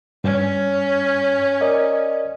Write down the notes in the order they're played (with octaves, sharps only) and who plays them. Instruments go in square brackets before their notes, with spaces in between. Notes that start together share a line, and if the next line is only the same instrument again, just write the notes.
[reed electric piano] G2 [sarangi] C#4
[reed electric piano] A#4 D5 D#5